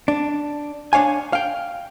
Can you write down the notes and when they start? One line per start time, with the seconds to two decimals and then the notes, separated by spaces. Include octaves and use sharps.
0.08 D4
0.93 D4 C#5 F5 G#5
1.33 F5 G5